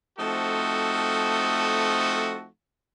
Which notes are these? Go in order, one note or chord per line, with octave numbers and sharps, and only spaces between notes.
F3 A3 C4 D#4 F#4 A4